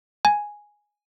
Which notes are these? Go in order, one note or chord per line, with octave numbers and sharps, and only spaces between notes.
G#5